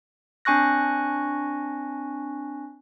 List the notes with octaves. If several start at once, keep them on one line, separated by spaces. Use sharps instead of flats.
C4 D4 G#5 C#6 F#6 A#6